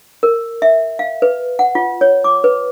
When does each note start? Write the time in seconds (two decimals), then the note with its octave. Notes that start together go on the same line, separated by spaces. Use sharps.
0.23 A#4
0.62 E5
0.99 F5
1.22 B4
1.59 F#5
1.75 F4
2.01 C#5
2.24 D6
2.44 B4